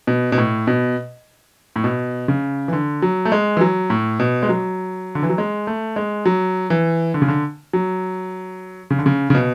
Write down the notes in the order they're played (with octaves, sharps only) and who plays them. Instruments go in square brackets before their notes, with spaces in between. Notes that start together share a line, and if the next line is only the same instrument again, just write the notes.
[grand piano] B2
B2
A2
B2
A2
B2
C#3
E3
D3
F#3
A3
G#3
E3
F#3
A2
B2
G#3
F#3
D3
E3
F#3
G#3
A3
G#3
F#3
E3
D3
C#3
D3
F#3
C#3
D3
C#3
C#3
B2